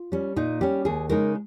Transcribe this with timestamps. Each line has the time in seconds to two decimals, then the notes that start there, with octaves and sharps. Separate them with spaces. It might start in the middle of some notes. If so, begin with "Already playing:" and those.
Already playing: F4
0.12 G3 C#4
0.36 A#2 D#4
0.61 G3 C#4 G4
0.85 D#2 G#4
1.09 C#3 G#3 D#4 A#4